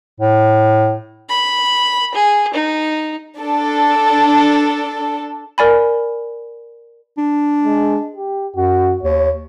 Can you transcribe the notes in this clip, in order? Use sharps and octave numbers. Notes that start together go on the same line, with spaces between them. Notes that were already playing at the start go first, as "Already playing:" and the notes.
A2
B5
G#4
D#4
D4 A4
A#4 D5 G#5 B5
D4
G#3
G4
F#2 F#4
D#2 C#5